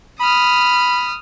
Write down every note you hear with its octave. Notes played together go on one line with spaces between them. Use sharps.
B5 D#6 F6